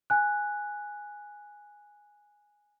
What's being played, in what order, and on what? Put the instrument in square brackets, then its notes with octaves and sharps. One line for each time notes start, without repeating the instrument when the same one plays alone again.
[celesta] G#5 F#6